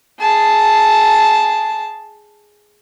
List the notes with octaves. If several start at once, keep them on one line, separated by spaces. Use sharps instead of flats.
G#4 A5